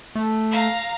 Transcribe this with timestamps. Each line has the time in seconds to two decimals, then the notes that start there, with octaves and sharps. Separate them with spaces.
0.15 A3
0.51 F5 A#5